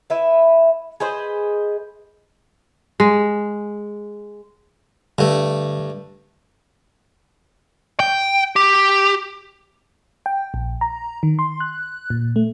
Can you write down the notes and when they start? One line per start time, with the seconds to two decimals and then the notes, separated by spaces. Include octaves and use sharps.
0.10 E4 B4 E5
1.00 G#4 B4 C5 D#5
3.00 G#3
5.18 G2 D3 A3
8.00 G5
8.56 G4
10.26 G5
10.54 A#1
10.81 A#5
11.23 D#3
11.39 C6
11.60 F#6
12.10 A#2
12.36 A3